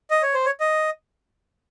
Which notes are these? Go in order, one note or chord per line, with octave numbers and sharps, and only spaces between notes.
D#5
C#5
C5
C#5
D#5